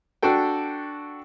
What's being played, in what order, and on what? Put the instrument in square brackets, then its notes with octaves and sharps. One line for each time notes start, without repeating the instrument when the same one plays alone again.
[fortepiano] D4 F#4 A4 G5